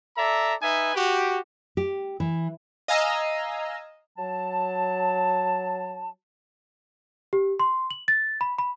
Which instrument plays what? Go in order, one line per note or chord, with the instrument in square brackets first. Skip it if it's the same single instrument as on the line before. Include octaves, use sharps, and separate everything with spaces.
[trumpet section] A4 D5 E5 A#5
D#4 B4 E5 G#5
F#4 G4
[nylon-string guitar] G4
E3
[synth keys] D#5 F5 G#5 A#5 E6
[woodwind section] F#3 A5
[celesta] G4
C6
F#7
A6
B5
B5